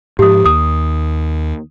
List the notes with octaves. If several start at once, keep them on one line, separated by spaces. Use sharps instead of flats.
G#2 F3 G4 D#6
D#2 D#6